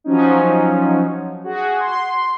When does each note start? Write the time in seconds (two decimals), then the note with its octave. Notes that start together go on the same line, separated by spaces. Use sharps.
0.04 F3 F#3 C#4 D#4
1.44 F#4 G#4
1.80 C6